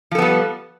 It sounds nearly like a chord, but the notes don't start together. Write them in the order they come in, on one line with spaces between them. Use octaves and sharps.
F3 A4 B3 G3